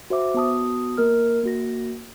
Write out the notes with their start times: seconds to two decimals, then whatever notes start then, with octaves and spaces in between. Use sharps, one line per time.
0.10 F#4 C5 E5 D6
0.34 B3 F#4 A5 D#6
0.97 A#3 A#4 F6
1.43 A#3 F#4 A#6